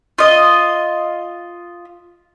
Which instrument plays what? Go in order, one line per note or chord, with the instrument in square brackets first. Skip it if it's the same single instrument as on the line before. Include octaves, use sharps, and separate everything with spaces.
[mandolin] F4 D#5